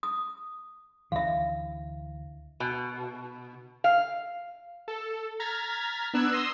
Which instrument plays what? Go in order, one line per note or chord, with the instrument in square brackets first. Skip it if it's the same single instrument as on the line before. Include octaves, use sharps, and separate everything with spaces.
[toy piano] D#6
[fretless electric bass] D2 D3 E3 [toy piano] E5 F5
[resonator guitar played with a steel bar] B2
F5
[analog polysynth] A4
A#5 F6 G#6 A6 B6
B3 D4 E6 F#6 G#6
C6 D#6 E6 A#6 C7